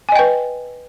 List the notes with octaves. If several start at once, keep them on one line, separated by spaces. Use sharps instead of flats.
B4 D#5 G5 G#5